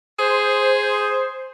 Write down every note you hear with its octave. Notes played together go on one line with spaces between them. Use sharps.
G#4 C5